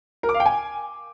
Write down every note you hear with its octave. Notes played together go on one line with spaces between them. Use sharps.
A#4
D6
F5
G5
G#5